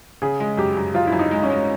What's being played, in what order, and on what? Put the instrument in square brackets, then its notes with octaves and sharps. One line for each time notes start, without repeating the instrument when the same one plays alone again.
[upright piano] C#3 [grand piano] G#4
[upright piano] G#3
[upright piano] F#2 [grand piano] G4
[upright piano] F#2
[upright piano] F#2 [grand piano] F4
[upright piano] F#2 [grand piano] E4
[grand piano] D#4
[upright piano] G#3
[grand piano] C#4
[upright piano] G#3